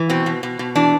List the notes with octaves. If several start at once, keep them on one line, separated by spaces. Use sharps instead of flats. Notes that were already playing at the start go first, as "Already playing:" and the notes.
Already playing: E3
B2 C4
B2
B2
B2
E3 D4